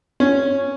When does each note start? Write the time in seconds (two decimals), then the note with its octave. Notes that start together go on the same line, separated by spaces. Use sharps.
0.20 C#4